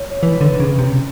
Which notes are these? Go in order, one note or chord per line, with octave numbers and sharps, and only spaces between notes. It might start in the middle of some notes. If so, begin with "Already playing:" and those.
Already playing: C#5
E3 B4
D3
C#3 C#4
C3